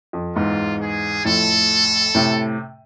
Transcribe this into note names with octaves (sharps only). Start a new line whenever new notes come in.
F2
E2 G#2 F4
G#4
F2 A2 A4
A2 C3